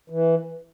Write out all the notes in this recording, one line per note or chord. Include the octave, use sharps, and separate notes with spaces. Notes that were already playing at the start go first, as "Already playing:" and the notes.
E3